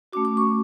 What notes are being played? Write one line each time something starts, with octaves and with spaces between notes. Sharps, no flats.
A3 C#4 F#4 D6
D6
C#6